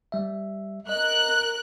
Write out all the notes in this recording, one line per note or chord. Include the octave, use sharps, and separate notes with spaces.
G3 E5
A#4 D#5 F#6